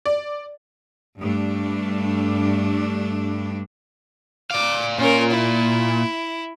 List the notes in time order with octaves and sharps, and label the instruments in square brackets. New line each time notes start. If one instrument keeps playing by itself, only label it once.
[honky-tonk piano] D5
[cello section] G2 A3 D4
[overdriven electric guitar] D5 F5 [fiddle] D6
[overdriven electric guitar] A#2 F4 [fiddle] C#4 A#4
[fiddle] E4